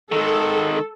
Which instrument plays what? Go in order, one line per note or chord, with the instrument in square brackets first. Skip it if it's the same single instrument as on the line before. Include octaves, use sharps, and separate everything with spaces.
[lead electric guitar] D#3 G#3 [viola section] A4